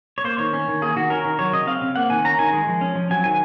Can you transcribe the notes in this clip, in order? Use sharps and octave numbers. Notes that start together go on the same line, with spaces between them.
C#5
A#3 C5
D#3 C#5
C#4
D#3
A#3 G#4
D#3 F#4
C#4 A#4
D#3
F#3 C#5
C#3 D#5
C4 F5
C#3
A#3 F#5
D#3 G#5
C#4 A#5
D#3 G#5
G#3
F3
C#4
F3
F#3 G#5
D#3 G#5